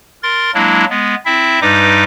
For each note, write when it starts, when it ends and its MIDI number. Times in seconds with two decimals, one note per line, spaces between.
0.23 0.51 70
0.23 0.51 84
0.23 0.51 93
0.54 0.85 54
0.54 0.85 56
0.54 0.85 58
0.54 0.85 62
0.54 0.85 64
0.90 1.15 56
0.90 1.15 59
1.25 1.59 60
1.25 1.59 64
1.25 1.59 76
1.61 2.04 43
1.61 2.04 55
1.61 2.04 63
1.61 2.04 71
1.61 2.04 75
1.61 2.04 86